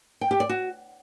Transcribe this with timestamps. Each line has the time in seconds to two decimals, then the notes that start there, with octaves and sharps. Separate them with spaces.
0.21 G5
0.31 G4
0.40 D5
0.49 F#4